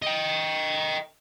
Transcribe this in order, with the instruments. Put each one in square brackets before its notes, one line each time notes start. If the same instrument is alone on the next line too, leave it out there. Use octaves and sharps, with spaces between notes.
[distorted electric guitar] D#5 G5